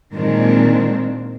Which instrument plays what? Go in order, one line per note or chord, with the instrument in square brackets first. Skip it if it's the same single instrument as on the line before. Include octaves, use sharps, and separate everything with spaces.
[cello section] A#2 D#3 G#3 C4 D4